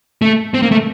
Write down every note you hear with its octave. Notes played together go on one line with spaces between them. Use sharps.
A3
C4
A#3
A3